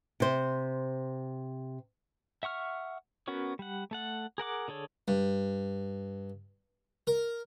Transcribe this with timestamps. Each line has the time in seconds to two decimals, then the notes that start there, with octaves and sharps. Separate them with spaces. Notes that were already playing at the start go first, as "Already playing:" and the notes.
0.20 C3 C5
2.43 E5 F#5 C#6 F6
3.28 B3 C#4 F#4 A#4 C#5
3.59 G3 F#5
3.91 A3 A4 F#5
4.38 G#4 A#4 F#5 D6
4.68 D3 G#4 A4 C#5
5.08 G2
7.07 A#4